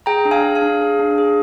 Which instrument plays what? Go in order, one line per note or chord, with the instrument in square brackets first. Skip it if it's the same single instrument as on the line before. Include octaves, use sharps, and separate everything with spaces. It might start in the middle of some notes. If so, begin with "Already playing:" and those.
[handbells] G#4 G5 A#5
D4
F5 G#5
G#4
F5 G#5
D4
G#4
D4
G#4